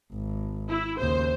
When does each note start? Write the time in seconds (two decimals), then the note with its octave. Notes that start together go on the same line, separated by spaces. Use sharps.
0.12 G#1
0.68 E4
0.99 D#2 C#3 C5